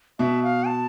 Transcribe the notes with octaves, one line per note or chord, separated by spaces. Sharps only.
B2 E5
F5
A5